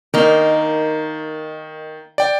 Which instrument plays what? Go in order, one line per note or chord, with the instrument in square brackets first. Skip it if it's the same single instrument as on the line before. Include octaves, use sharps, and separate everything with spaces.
[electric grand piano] D#3 [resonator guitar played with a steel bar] A#3 D#4
[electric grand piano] D5 G5